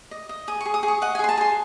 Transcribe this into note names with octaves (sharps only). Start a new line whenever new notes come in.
D#5
D#5
G#4 D#6
G#4 C#6
D#6
G#4
C#6
D#5 F#5
G#5
G#4 C6
A5
G#4 C6